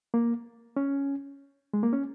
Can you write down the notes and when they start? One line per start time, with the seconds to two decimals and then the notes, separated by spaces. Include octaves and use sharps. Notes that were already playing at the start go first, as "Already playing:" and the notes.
0.14 A#3
0.77 C#4
1.73 G#3
1.83 A#3
1.93 C#4